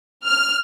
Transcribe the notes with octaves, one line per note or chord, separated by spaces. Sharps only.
F6